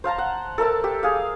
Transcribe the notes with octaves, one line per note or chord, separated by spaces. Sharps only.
C5 F5 A5 A#5
F#5
A4 A#4 E5 A5
G4
G#4 F5